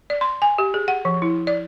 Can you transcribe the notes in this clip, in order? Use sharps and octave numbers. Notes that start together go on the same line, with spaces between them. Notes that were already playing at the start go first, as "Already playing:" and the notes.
D5
C6
G#5
G4
G#4
F#5
F3
E4
D5